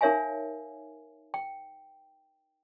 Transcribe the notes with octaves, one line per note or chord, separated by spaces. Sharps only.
D#4 A#4 C#5 E5 F5 G#5
G5